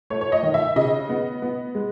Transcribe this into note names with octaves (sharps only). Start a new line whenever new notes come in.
A3 C#5
C#5
D#5
D#3
E5
C#3 D#5
B3
B3
G#3